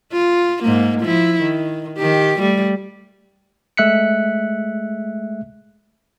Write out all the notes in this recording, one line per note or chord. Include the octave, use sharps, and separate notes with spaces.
F4
G#2 A#3
F3 E4
D#3
D#3 G4
G3 A3
G#3 A3 E5 F#6 B6 C#7